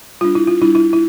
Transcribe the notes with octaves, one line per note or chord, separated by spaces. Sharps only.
G3 D4 F4
E4
F4
G3 D4 E4
E4
E4